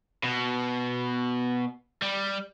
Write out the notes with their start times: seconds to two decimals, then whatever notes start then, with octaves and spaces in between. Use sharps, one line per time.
0.24 B2
2.02 G3